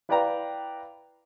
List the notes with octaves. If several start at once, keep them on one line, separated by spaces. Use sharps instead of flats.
E4 B4 D5 F5 G5 A#5